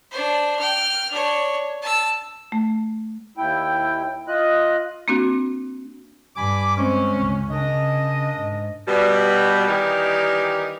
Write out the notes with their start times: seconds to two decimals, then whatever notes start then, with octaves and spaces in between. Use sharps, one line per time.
0.11 D4 C5
0.59 G5 F6
1.12 D4 C#5
1.82 A5 E6
2.52 A3
3.37 D#2 E4 G5
4.28 F4 D#5 F#6
5.08 A#3 C4 D4 F#4
6.36 G2 G#5 B5 D6
6.78 G#3 C4 C#4
7.20 C#2
7.51 C#3 D4 A#4 D#5
8.38 G#2
8.87 B2 G3
9.68 D#3 E3 G3 D#4 G4 A#4